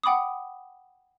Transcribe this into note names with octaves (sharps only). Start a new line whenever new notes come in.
F#5 G5 B5 D6 D#6